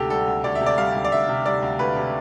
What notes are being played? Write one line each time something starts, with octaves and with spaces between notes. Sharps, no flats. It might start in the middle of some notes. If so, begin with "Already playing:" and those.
Already playing: D2 C3 G4 A4
G3 A4
D2
D2 D5
E5
C3
D5
G3 F5
D2
D5
D2 E5
C3
G3 D5
D2
D2 B4
C3